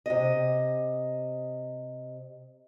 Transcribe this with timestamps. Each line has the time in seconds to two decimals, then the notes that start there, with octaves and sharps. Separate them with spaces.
0.06 C3 D#5